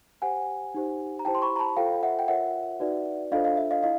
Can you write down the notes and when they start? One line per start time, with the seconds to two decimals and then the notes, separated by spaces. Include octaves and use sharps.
0.22 G4 C5 F#5 G#5
0.74 D#4 G4 C5
1.19 A#5
1.25 E4 G4 C5 G5 A5
1.35 C6
1.42 B5 C#6
1.56 A#5
1.59 A5 B5
1.76 F4 A4 C5 F5 G5
2.03 E5 F#5
2.19 G5
2.28 F4 A#4 C#5 E5 F#5
2.80 D#4 F#4 B4 D5
3.32 D4 F4 A4 C5 D#5 F5
3.44 D#5 F5
3.57 E5
3.71 D#5 F5
3.83 E4 D#5 F5